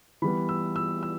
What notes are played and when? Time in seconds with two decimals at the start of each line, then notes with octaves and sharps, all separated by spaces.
0.22 E3 G3 B3 B5
0.49 E6
0.76 E6
1.03 E6